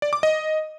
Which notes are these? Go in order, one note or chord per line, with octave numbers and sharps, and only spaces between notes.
D5
D6
D#5